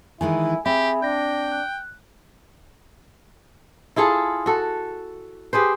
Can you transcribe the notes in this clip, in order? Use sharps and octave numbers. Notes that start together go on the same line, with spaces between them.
D#3 E3 G#3 E4 G#5
C4 G4 G#4 E5 B5
D4 G5 G6 A#6
F#6
E4 F4 G#4 A4
F#4 A4
G4 G#4 B4 C5